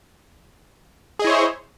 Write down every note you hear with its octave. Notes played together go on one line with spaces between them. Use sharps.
E4 G#4 C5 C#5 D#5